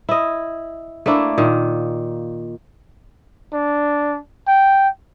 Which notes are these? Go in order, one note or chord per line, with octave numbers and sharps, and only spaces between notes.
E4 D#5
A3 A#3 D4 E4
A#2 D#3
D4
G5